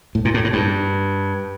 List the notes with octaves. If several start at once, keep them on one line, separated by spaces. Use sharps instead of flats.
A2
A#2
A2
A2
G2